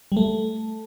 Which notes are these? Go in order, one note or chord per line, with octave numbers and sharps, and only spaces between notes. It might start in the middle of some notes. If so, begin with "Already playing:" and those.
G3
A3